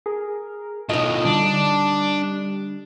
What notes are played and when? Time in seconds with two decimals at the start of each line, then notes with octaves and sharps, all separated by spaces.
0.06 G#4 A#4
0.89 B1 A2 D#4 F4 D#5
1.25 D3 G3 D4